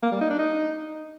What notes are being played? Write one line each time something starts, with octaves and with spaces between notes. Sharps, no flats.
A#3
G3
D#4
D4
D#4